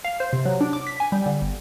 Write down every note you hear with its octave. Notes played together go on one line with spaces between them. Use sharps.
F5
C5
C3
F#3
D4
D6
B6
G#5
G3
D3
G1